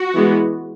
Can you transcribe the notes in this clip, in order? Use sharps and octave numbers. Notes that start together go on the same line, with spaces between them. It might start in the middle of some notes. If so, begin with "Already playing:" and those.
Already playing: F#4
E3 G#3 B3